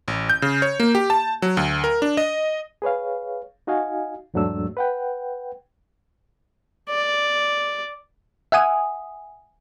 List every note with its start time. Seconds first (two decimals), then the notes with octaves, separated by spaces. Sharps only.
0.08 A1
0.30 G6
0.42 C#3
0.62 C#5
0.80 A#3
0.95 G4
1.10 A5
1.42 F#3
1.57 D2
1.84 A#4
2.02 D4
2.17 D#5
2.82 G#4 B4 C#5 F5
3.67 D#4 F#4 D#5 F5 G#5
4.34 E2 G#2 F#3 A3 D4 E6
4.77 B4 F#5 G5
6.89 D5
8.52 E5 F#5 G#5 D#6